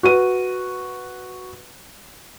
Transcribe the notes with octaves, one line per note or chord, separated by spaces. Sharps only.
F#4 B4 D#7